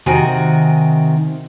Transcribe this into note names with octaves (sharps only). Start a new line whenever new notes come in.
C3 D#3 C4 F#4 D#5 G#5